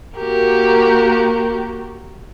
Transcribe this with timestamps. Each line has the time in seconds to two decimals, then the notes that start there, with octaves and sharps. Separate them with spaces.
0.17 A#3 F#4 G4 A#4